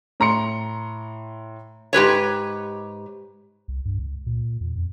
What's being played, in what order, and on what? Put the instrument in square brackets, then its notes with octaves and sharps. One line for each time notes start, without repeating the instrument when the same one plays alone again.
[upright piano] A2 A#5 C6 C#7
[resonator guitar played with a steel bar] G#2 G4 B4 C#5
[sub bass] C2
G2
C#2
A#2
E2
F2